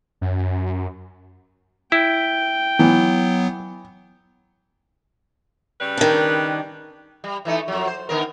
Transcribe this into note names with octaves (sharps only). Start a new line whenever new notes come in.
F#2
E4 G5
E3 F#3 B3
C#3 G3 B4
D#3 D4
G3
E3 A3 D#4
F2 F#3
C5
D3 B3 A#4